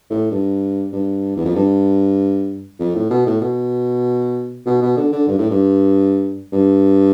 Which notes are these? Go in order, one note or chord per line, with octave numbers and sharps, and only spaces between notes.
A2
G2
G2
E2
F2
G2
F2
A2
B2
A2
B2
B2
B2
D3
D3
G2
A2
G2
G2